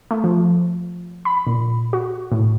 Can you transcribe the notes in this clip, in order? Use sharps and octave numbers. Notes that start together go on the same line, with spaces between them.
A3
F3
B5
A#2
F#4
A2